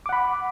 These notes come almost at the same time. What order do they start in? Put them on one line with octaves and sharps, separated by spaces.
D6 F#5 B5